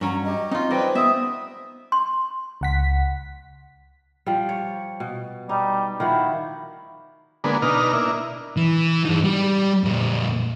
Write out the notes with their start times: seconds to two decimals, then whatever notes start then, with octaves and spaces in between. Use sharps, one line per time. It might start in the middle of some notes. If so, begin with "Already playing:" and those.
0.01 G2 F#3 C#4 A#5
0.24 G4 D#5
0.51 C4 D#4 F4
0.71 G3 A4 B4 C5 D#5 G5 G#5
0.95 B3 E5 D#6
1.92 C6
2.61 C#2 F#5 B6
4.26 F3 G3
4.49 C#5
5.00 B2
5.49 G3 D#4
6.00 D#3 F3 E4 F#4
7.44 D3 G#3 A#3 B3
7.62 B2 D4 D#4 A#5 F6
7.93 A#3 D4 E4
8.57 E3
9.05 G2 D#4
9.24 G3
9.84 F2 A#2